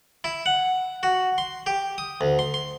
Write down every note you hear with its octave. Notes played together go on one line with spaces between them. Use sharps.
E4
F#5
F#4
C6
G4
D#6
D2
C6
C6